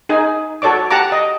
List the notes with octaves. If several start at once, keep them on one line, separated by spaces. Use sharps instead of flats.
D#4 G#4 G#5
F#4 A4 C#5 D5 D6
G4 F#5 A5 A#5 D6
D#5